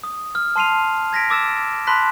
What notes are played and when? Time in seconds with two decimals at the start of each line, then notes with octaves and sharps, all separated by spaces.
0.04 D#6
0.35 F6
0.56 A5 C6 C7 D#7 F7
1.13 G#6 A#6 B6 D7
1.30 D6 E6 A6 E7
1.87 A5 B5 C6 F#6 B6